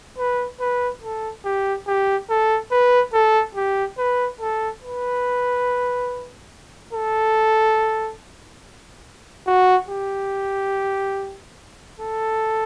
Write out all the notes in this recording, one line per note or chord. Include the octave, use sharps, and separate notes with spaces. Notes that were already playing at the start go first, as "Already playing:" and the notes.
B4
B4
A4
G4
G4
A4
B4
A4
G4
B4
A4
B4
A4
F#4
G4
A4